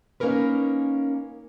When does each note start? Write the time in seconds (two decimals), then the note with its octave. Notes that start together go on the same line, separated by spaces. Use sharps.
0.20 A#3 C#4 D#4 A#4 B4